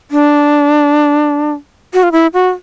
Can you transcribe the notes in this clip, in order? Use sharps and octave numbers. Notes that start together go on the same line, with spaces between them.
D4
F#4
F4
E4
F#4